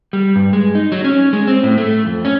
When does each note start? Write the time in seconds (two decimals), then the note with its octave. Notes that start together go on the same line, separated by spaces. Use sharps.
0.13 G3
0.36 G2
0.53 G#3
0.75 D#4
0.92 F#3
1.05 C#4
1.33 G#3
1.48 C4
1.63 A2
1.78 A3
2.06 F2
2.25 C#4